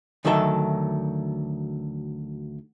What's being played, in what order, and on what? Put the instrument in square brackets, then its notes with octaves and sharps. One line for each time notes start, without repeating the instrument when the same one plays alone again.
[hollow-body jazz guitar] D2 D#3 F#3 A4 E5